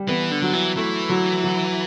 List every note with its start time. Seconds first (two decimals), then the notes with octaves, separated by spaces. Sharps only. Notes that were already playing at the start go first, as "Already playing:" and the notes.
Already playing: G3
0.08 E3 B3
0.32 D3
0.42 F#3
0.53 E3
0.76 E3 A3
1.09 F#3
1.44 F#3